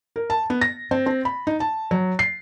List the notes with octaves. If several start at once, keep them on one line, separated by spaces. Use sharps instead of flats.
A#4
A5
B3
A#6
C4
C4
B5
D#4
A5
F#3
C7